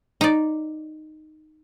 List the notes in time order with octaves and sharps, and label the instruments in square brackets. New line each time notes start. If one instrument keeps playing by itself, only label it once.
[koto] D#4 D5